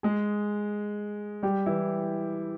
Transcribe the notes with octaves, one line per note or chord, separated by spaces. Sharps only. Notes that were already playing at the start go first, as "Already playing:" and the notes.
G#3 G#4
G3 G4
E3 E4